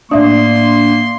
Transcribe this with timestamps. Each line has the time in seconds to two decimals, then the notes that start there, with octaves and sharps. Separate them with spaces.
0.11 A2 A#3 D4 D5 E5 C6 D#6